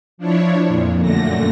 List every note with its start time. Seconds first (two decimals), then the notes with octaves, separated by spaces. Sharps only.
0.18 F3 D4 E4 C#5
0.67 F2 A#2
0.98 F#2 A#2 D3 A3 A#6